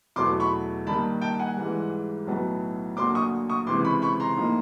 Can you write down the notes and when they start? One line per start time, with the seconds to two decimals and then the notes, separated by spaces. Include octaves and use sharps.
0.16 E2 B2 F#3 A3 C6 D6
0.40 B5 C#6
0.87 G2 D#3 G3 A#3 A5 B5
1.21 G5 A5
1.39 F#5 G#5
1.57 G#2 E3 G3
2.27 B1 A2 F#3 B3
2.97 D2 D3 F#3 A#3 C6 D6
3.15 C#6 D#6
3.49 C#6 D#6
3.67 C#2 C3 E3 C6 D6
3.85 B5 C#6
4.02 B5 C#6
4.20 A#5 C6
4.37 A2 F3 A#3 D#4